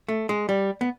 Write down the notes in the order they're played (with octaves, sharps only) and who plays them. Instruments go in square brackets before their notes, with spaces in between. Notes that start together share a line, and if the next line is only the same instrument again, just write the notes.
[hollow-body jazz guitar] A3
G#3
G3
B3